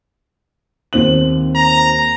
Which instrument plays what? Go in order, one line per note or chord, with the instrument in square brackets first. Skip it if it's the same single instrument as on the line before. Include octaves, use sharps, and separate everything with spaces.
[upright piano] D#2 C4 F#7
[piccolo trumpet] A#5